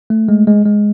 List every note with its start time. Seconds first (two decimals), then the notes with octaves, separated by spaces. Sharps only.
0.10 A3
0.29 G#3
0.47 G#3
0.65 G#3